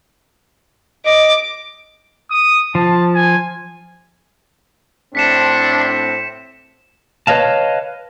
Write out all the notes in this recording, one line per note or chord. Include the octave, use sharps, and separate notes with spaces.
D#5 D6
D#6
F3 A5
G#5
A2 C4 D4 B6 C#7 E7
B4 C#5 D#5 F5 A5